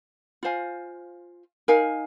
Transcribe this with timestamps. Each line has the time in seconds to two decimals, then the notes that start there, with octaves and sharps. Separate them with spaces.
0.43 F4 C5 F5 G#5
1.68 D#4 A#4 F5 G#5